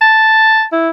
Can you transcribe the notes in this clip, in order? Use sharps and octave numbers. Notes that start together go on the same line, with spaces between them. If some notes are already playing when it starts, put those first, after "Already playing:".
A5
E4